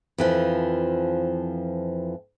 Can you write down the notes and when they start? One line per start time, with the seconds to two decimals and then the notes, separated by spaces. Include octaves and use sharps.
0.18 F2 E3 F3